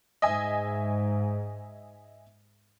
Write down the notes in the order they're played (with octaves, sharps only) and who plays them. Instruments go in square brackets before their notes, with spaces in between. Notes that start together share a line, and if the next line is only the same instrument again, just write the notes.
[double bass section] G#2 [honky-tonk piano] D#5 E5 G#5